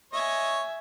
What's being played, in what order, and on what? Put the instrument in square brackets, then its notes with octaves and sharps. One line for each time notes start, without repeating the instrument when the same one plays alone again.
[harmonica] C#5 D#5 [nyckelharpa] E5 G#5